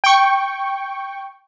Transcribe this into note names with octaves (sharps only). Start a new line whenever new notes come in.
G5 C#6